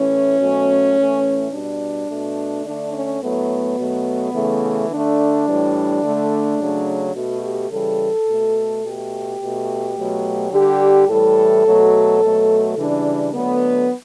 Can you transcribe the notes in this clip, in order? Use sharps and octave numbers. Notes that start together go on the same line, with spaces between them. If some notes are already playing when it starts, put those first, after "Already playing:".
Already playing: A2 E3 A3 C#4
B2 F#3 A3
A2 E3 A3
B2 G3 D4
B2 A3
D3 A3 D4
C#4
A2 F#3 A3 B3
B2 F#3 A3
C#3 E3 A3
D3 A3 D4
A2 E3 G3
D3 A3
C#3 F#3 A3
B2 A3 F#4
G4
C#3 E3 G3 A4
B2 A3
B2 A3 G4
B2 A3
B2 F#3 A3
D3 G3 G4
A2 E3 G3 A4
B2 F#3 A3
B2 F#3 A3
C#3 E3 G3 D4
D3 F#3 A3 B3